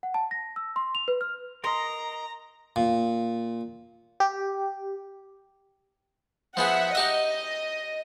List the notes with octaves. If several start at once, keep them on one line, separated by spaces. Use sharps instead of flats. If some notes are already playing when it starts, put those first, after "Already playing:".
F#5
A5
A#6
E6
C6
F7
B4
F6
A#4 D#5 A#5 C6
A#2
G4
F3 B3 G#4 E5 F#5
D#4 G4 D#5 E5